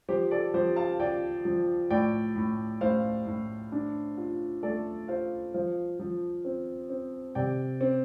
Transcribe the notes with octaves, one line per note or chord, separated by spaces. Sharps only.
F3 G4 C5
A4 D5
F3 G4 C5
F5 A5
F4 D5 G5
F3
A2 D5 G5
A2
A2 C5 F5
A2
D4
F4
A3 A4 D5
F4 C5 F5
F3 C5 F5
F3
C4
C4
C3 D5 G5
C4